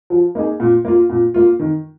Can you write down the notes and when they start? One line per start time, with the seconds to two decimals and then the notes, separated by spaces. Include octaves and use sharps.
0.10 F3
0.35 A#3 D#4 G#4
0.60 A#2
0.85 A#3 F4
1.10 A#2
1.34 A#3 F4
1.59 D#3